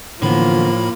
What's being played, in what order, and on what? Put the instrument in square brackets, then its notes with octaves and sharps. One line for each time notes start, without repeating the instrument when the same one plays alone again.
[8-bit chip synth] A2 B5 [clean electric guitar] D3 E3 B3 [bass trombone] F3 [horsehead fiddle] A#3 F4